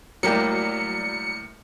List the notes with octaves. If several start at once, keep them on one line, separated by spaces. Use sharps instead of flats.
A2 F#3 G3 A#3 G4 C#7